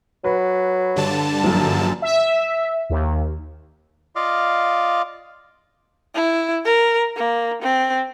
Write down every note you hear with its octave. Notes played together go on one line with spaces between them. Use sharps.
F#3 B4
G2 D3 A5
A#1 F#2
E5
D#2
F4 D5 D#5 F5
E4
A#4
A#3
C4